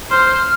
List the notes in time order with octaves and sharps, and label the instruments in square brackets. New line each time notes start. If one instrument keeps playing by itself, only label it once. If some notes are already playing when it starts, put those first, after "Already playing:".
[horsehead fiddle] C5 [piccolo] F6